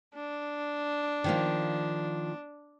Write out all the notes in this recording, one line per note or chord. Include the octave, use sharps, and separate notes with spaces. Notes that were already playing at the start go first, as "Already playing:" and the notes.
D4
D#3 F3 A#3